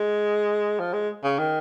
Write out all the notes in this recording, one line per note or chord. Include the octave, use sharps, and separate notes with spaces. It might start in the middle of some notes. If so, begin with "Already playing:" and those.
Already playing: G#3
F3
G#3
C#3
D#3